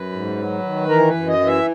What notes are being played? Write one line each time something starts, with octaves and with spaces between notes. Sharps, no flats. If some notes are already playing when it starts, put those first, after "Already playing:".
Already playing: F#2 B4
G#2
F#3
D#3
E3 A#4
B4
F#2
D#5
E3
E5